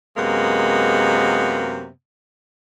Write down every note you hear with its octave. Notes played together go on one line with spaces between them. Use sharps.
F#2 C3 G#3 A#3 B3